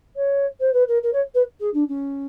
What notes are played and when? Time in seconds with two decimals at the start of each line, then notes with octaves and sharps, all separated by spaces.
0.16 C#5
0.60 C5
0.73 B4
0.88 A#4
1.02 A#4
1.13 C#5
1.34 B4
1.59 G#4
1.73 D4
1.88 C#4